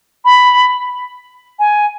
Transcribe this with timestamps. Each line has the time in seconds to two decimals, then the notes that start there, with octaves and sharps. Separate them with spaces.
0.25 B5
1.59 G#5